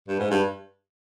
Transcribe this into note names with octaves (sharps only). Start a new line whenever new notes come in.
G2
G#2
G2